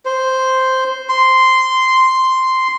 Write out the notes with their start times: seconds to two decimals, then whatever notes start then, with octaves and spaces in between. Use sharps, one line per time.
0.05 C5
1.09 C6